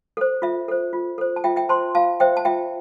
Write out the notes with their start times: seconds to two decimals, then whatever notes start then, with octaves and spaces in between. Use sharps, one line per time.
0.17 A4 C5
0.42 F4 E5
0.68 A4 C5
0.93 F4
1.18 A4 C5
1.36 A5
1.44 F4 E5 G5
1.56 E5 G5
1.69 C5 A5 C6
1.95 F4 F5 A5
2.20 C5 E5 G5
2.37 A5
2.45 F4 E5 G5